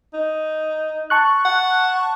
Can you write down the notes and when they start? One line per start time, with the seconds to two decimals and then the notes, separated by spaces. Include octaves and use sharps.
0.14 D#4
1.10 A5 C#6 F#6
1.45 F#5